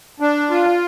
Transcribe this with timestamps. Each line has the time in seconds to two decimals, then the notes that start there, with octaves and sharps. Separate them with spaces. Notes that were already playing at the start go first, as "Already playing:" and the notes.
0.20 D4
0.50 F4